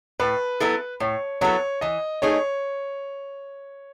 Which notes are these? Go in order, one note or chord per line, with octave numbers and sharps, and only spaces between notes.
A2 B4
F#3 B3 E4 A4
A2 C#5
F#3 B3 E4 A4 C#5
E3 D#5
A3 D#4 G#4 C#5